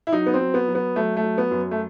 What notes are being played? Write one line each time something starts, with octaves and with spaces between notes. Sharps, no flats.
E4
F#3 D#4
B3
C4
F#3
B3
F#3
B3
F#3 A3
A3
F#3
B3
F#2
A3